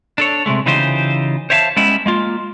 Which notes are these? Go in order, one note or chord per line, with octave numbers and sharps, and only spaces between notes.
D4 A4 C#5
C3 D#3 G#3 A3
C#3 E3 D#4 F4 G4 C5
C5 C#5 E5 F5 G5 A5
G3 G#3 B3 C#4 E4
G#3 A#3 F4